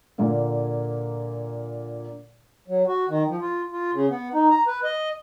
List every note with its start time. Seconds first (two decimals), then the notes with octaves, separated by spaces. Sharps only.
0.18 A#2 D3 A#3
2.67 F#3
2.88 F#4
3.09 D#3
3.29 F3
3.41 F4
3.72 F4
3.93 C#3
4.10 B3
4.34 D#4
4.50 A#5
4.67 B4
4.83 D#5